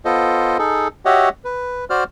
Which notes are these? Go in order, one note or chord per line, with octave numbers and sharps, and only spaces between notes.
B3 F4 A4 C5 D#5
D#4 G#4 A4
F#4 G4 C#5 D#5 E5 F#5
B4
F#4 C5 D5 F6